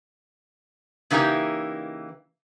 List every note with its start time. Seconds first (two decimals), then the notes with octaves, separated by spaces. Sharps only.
1.11 C#3 E3 A#3 D#4 G4